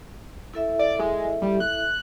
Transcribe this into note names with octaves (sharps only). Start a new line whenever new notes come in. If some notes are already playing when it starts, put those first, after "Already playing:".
E4 A4 E5
D5
G#3
G3
F#6